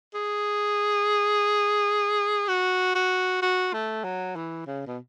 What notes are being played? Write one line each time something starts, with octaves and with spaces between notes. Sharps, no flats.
G#4
F#4
F#4
F#4
A3
F#3
E3
C#3
B2